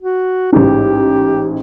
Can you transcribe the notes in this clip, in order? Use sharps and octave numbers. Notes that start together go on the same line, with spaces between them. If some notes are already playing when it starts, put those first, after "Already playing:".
F#4
A1 G#2 G4